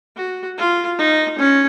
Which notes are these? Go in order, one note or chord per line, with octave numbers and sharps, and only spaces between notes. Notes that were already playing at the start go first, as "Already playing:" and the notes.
F#4
F4
D#4
C#4